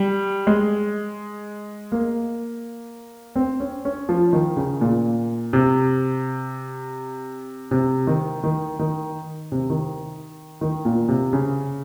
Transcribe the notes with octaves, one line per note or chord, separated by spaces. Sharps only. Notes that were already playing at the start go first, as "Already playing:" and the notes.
Already playing: G3
G#3
A#3
C4
C#4
C#4
F3
D#3
C#3
A#2
C3
C3
D#3
D#3
D#3
C3
D#3
D#3
A#2
C3
C#3